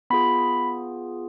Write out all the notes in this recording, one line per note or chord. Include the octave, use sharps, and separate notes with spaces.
B3 F4 G#4 B5